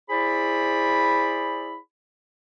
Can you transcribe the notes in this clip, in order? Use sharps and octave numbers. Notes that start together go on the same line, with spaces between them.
E4 G#4 C5 D5 B5